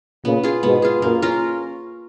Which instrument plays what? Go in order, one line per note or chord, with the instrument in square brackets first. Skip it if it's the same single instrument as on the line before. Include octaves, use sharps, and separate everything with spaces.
[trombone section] A#2 C#3 [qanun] B3
[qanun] F4 G#4
[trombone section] G#2 B2 [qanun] B3
[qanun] F4 G#4
[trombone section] F#2 A#2 [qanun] A#3
[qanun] C#4 F4 A#4